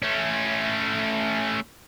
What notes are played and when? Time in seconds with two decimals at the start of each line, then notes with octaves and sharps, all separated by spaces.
0.02 A3 C#4